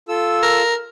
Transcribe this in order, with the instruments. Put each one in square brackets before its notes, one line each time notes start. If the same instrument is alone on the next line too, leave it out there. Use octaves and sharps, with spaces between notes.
[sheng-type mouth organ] F4 A4 E6
[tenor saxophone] A#4